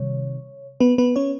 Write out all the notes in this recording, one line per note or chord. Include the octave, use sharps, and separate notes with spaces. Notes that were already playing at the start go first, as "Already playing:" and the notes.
Already playing: C3 D#3 G3 C#5
B3 B4
B3 B4
C#4 C#5